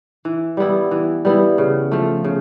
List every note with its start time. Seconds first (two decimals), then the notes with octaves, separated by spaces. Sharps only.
0.25 E3
0.57 G3 B3 E4
0.91 E3
1.25 G3 B3 E4
1.58 C#3
1.92 F3 A3
2.24 C#3